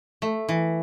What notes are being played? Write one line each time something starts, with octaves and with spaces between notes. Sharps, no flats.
A3
E3